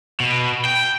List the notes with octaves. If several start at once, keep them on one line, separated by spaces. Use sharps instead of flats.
B2
G5